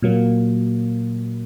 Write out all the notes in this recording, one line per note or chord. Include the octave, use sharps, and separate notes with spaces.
A#2 F#3 A#3